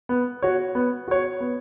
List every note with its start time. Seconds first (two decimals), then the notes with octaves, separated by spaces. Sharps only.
0.09 B3
0.43 F#4 C#5
0.75 B3
1.08 F#4 C#5
1.41 B3